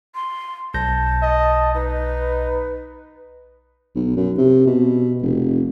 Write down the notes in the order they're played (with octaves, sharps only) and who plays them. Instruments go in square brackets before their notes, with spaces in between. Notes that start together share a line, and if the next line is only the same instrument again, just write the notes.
[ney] C6
[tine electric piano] B1 G6 A#6 [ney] A5
[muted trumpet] D#5
[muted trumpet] D#4 [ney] B4
[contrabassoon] B1
F#2
C3
B2
F1